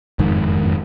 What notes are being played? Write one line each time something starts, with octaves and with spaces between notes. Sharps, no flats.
F#1 F2 G#2 D#3